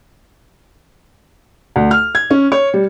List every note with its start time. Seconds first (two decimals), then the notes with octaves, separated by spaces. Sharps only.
1.76 D2
1.91 F6
2.15 G#6
2.30 C#4
2.52 C#5
2.74 G3